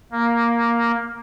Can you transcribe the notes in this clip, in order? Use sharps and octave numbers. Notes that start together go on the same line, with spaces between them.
A#3